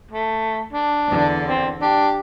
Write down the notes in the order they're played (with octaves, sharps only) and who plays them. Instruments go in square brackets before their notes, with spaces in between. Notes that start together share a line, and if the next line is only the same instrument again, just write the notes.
[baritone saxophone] A3
D4
[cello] E2 D3
[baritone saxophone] C4
[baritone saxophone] D4 [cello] G4